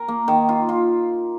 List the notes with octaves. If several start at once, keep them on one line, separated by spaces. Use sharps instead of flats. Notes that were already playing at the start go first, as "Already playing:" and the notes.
Already playing: A#4
A#3
D#3
F4
F4